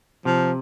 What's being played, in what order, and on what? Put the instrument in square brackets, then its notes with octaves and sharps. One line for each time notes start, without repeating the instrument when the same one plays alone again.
[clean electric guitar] C3 [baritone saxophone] F3